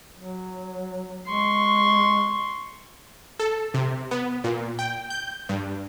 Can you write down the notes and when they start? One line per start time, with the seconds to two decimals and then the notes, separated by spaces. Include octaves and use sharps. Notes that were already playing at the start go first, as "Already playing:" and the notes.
0.17 F#3
1.27 G#3 C6 C#6
3.40 A4
3.74 C3
4.11 B3
4.44 A#2
4.79 G5
5.10 G6
5.49 G2